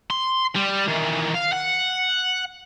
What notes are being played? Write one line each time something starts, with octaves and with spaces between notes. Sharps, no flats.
C6
G3
D#3 E3
F5
F#5